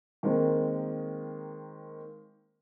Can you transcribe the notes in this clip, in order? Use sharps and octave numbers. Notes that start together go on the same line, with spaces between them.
D#3 G#3 A#3 C4